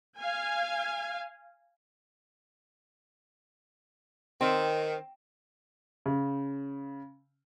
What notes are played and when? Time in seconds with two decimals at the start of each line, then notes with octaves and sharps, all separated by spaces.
0.17 F5 G#5
4.41 D#3 C4
6.06 C#3